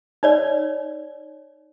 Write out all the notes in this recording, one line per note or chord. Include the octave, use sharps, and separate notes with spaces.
D#4 C#5 D5